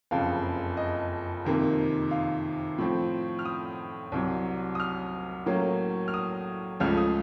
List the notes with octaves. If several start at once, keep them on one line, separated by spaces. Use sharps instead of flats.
F#1 F2 C#3 F5
D#5
F2 C3 D#3 A#3
F5
A2 F3 C4
F6
D#6
C2 C3 F#3
D#6
F6
A2 F#3 A#3 C#4
F6
D#6
C#2 C#3 F3 A3 F6
D#6